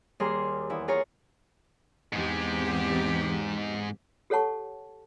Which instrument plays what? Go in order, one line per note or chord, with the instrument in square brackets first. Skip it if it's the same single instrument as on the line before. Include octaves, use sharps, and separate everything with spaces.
[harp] D#2 G3 G#4 A#4 C6
E2 E4
F4 G#4 A#4 C#5
[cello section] E2 C4 G4 [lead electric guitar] G#2 G#3
[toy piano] G4 A4 C#5 F#5 A5 C#6